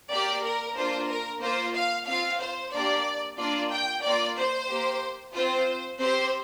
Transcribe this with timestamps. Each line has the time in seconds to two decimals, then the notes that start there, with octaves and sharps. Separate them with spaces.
0.11 A#3 G4 D5
0.44 A#4
0.77 A#3 D4 F4 C5
1.10 A#4
1.41 A#3 F4 C5
1.75 F5
2.08 C4 F4 F5
2.40 C5
2.73 A#3 D4 G4 D5
3.38 A#3 D4 F4 D5
3.71 G5
4.04 A#3 F4 D5
4.36 C5
4.69 A#3 G4
5.35 C4 F4 C5
6.00 C4 G4 C5